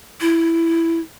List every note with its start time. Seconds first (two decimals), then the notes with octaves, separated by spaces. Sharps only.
0.21 E4